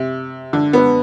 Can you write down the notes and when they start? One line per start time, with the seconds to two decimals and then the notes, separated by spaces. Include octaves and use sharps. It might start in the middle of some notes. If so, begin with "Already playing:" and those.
Already playing: C3
0.53 D3
0.73 B3